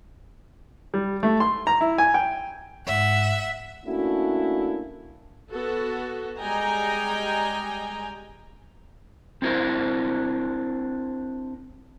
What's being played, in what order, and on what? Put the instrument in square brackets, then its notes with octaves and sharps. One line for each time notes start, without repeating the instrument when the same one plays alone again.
[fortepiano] G3
A3
C6
A#5
E4
G#5
G5
[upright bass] G#2 [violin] E5 F#5
[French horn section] A3 A#3 C#4 D4 E4 F#4
[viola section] B3 F#4 A4
G3 G#3 D#5 G5 G#5 A#5
[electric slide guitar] C4 D4 E4 A#4 C5